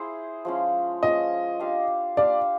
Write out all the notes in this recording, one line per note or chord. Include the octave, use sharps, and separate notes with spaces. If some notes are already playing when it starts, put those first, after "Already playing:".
Already playing: E4 G#4 C5
F3 G#3 C#4
F3 G#3 C#4 D#5
D4 G4 C5 F5
D4 G4 C5 D5 F5